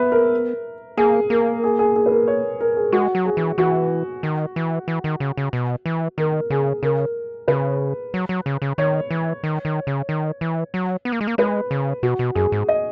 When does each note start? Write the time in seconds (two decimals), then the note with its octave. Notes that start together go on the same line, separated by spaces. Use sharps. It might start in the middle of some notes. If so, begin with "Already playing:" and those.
Already playing: B3 B4 E5
0.12 A#4
0.97 A#3 G#4
1.30 A#3 A#4
1.64 G#4
1.79 G#4
1.96 G#4
2.06 B4
2.11 A#4
2.27 C#5
2.61 A#4
2.77 G#4
2.92 G#3 F#4
3.15 F#3
3.25 G#4
3.37 E3
3.58 E3 F#4
4.23 D#3
4.56 E3
4.88 E3
5.04 D#3
5.20 C#3
5.37 C#3
5.53 B2
5.86 E3
6.18 D#3 A#4
6.50 C#3 G#4
6.83 C#3 A#4
7.48 C#3 B4
8.14 F#3
8.29 F#3
8.46 C#3
8.62 C#3
8.78 D#3 C#5
9.11 E3
9.44 D#3
9.65 D#3
9.87 C#3
10.09 D#3
10.41 E3
10.74 F#3
11.05 B3
11.12 A#3
11.21 G#3
11.27 A#3
11.38 G#3 B4
11.71 C#3
12.03 B2 F#4
12.19 B2
12.35 F#2 G#4
12.52 G#2
12.69 D#5